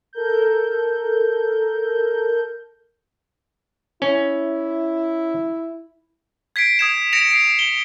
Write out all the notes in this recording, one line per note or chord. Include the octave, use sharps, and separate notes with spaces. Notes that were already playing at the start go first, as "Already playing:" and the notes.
A4 A#4 G6
C#4 E4
G#6 B6 C7 D7
D#6 G#6 E7
A#6 C#7 D7 F7
C7 D7
G7